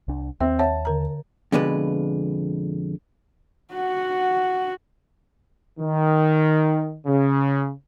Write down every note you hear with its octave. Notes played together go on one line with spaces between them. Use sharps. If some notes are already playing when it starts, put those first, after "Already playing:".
C2 D4
D#2 C4 E5
C#5 E5 F#5 A5
D3 A#4 A#5
F2 B2 D3 G#3 B4
F#4 F#5
D#3
C#3